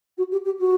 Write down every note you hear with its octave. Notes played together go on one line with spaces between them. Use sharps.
F#4
G4
G4
F#4